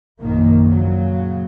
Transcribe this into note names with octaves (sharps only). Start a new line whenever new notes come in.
A#1 F#2 A#2 D#3 A#3
A#2 C#3 F#3